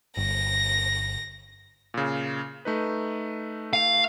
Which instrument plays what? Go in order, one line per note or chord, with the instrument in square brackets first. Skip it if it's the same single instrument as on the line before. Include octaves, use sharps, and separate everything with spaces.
[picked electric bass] G1 [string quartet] A#6
[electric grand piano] A#2 C#3
A3 D#4 B4
[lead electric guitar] F5